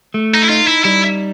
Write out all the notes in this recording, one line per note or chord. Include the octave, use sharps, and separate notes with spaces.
A3
D#4
E4
D#4 F4
E4
G3 E4